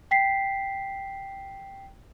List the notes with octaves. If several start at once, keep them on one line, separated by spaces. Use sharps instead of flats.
G5 B6 C7